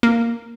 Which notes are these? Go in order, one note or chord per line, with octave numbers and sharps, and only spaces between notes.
A#3